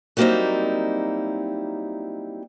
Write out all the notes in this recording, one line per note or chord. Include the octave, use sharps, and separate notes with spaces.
F#3 G3 A#3 C4 D#4 E4